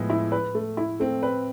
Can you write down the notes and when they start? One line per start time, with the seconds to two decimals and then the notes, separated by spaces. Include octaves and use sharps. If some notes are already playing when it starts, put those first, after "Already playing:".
Already playing: A2 F3 G#3 B3
0.10 E4
0.32 B4
0.55 A3
0.77 E4
1.00 A3 C4
1.23 B4